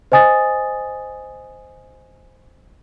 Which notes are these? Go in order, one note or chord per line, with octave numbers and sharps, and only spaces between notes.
C5 D#5 G#5 D#6 A6